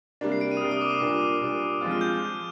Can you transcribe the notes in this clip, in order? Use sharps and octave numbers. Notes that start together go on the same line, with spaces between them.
C3 G3 A#3 D4
C7
D7
D#7
D#6
C3 G3 A#3 D4 F6
D#6
D6
D#6
A#2 G3 A#3 D4
A#2 G3 A#3 D4
F3 G#3 C4 F4
F6
G6